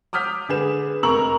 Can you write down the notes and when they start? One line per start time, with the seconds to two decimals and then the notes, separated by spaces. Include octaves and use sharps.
0.13 D6 D#6 F6 G6 B6
0.49 D3 G#4 B4 E7
1.03 F1 A#4 A#5 C#6 E6 F#7